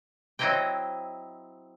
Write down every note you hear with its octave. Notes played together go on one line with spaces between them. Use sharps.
F#3 C4 D#4 E4 D#5 G5